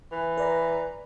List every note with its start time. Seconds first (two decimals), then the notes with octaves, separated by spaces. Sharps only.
0.11 E3
0.38 B4 D5 A#5